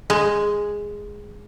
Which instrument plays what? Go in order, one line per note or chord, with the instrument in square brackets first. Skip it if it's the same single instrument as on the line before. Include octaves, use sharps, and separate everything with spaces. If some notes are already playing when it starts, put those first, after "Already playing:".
[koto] G#3